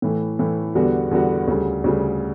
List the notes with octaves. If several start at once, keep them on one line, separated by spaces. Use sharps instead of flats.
A2 E3 A3
A2 E3 A3
E2 D3 G3 B3 F#4
E2 D3 G3 B3 F#4
D2 C#3 G3
D2 C#3 G3